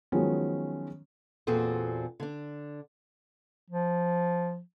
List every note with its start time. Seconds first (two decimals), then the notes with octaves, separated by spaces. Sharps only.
0.12 D#3 F3 F#3 G#3 B3 C#4
1.47 E2 A#2 C4 F#4 G#4 A4
2.20 D3 D4
3.70 F3